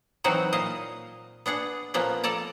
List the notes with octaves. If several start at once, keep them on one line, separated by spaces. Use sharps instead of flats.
E3 F#3 C4 D#4 F#4
A#2 D#5 F5
B3 D4 G#4 F#5
A#2 F3 A#3 B3 C#4
A4 D5 A5 A#5